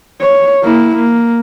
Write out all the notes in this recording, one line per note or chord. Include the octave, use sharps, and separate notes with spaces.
C#5
A#3 E4
A#3